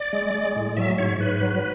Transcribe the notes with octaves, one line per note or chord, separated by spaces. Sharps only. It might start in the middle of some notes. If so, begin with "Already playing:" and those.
Already playing: D5
G#3
G#3
A2
F#3 E5
G#2 C#5
G#2 B4
F#3